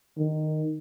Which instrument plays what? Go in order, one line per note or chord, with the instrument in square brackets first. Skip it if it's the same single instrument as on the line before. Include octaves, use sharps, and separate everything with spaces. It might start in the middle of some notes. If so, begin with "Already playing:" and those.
[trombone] D#3